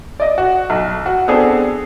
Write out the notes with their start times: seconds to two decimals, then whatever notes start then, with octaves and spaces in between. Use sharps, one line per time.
0.20 D5 D#5
0.38 F#4
0.70 B1
1.06 F#4
1.28 B3 C4 D4 G#4 A4